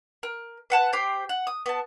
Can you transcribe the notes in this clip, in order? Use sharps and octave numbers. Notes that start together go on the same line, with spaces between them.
A#4
B4 F#5 A5 F#6
G4 C5 G5
F#5
D#6
B3 A5